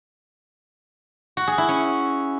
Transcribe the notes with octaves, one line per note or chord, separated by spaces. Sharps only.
F#4
G#4
E4
C#4